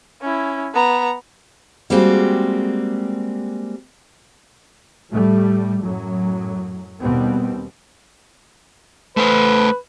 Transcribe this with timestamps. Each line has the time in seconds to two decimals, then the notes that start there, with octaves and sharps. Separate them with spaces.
0.21 C#4 E4
0.74 B3 A#5
1.90 G3 G#3 A#3 C4 F#4 G4
5.10 A2 G3 A3
5.83 F#2 A2 F#3
7.01 D#2 B2 G3 B3 C4
9.17 A3 B4 C5